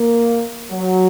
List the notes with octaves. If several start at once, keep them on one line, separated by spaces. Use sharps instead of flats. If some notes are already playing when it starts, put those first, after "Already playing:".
Already playing: A#3
F#3